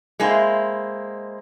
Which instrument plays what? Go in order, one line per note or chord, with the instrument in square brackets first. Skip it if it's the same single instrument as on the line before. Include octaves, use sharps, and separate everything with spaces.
[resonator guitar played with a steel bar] G#3 A#3 C4 E4